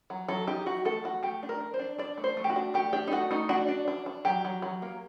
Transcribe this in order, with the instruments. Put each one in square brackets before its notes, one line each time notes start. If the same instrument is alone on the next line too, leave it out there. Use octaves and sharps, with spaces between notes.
[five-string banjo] F#3
F#3 A4
D#4 G4
F#3 F#4
A3 A4
A3 F#4
A3 G4
D4
A#4
D4
C5
D4
D4 D5
A3
C5
A3
G4
F#4
D4
A3 G4
D4 G4
D#4
A3 F#4
A3 D#4
D4 F#4
D4
D4
D4
F#3 G4
F#3
F#3
A#3